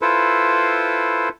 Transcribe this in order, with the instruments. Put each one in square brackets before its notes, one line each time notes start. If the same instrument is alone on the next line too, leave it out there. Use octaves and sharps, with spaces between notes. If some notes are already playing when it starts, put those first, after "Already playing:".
[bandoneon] E4 F4 A4 B4 C5